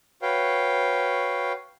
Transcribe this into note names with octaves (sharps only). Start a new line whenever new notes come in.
F#4 B4 C#5 F5 G5